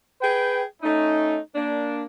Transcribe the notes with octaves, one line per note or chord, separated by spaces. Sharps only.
G#4 B4 G5
A3 C#4 D#4
A#3 D4